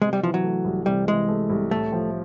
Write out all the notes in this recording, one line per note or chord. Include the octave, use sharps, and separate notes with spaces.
C3 G#3
G3
E3 F3
F#3
A3
C2
C3 G3
E3 G#3
A3
C2
A2 A3
F3